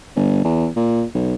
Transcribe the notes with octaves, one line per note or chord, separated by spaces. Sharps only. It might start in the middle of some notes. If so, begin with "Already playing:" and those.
G1
E2
A#2
B1